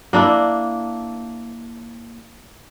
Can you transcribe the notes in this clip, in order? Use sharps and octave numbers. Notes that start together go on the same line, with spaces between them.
A#3 D4 E4